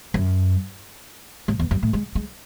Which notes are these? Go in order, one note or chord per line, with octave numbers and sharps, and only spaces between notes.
F#2
G#2
E2
F#2
A2
G#3
G#3